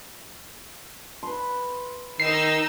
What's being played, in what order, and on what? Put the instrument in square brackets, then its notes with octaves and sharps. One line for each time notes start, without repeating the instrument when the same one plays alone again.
[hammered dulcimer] B4 C6
[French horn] D#3 [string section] D#4 E6 [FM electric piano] C7